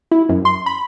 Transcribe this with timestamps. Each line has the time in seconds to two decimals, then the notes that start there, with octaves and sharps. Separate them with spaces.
0.11 E4
0.29 F#2
0.45 C6
0.66 B5